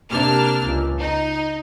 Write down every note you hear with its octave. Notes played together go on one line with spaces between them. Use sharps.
C3 A#3 D4 A5 F6
C#2
D#4